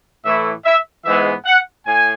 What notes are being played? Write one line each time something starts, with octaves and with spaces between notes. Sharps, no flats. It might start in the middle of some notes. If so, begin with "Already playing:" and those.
A2 E3 A3 E4 E5
E5
G#2 E3 G#3 B3 E5
F#5
A2 G#5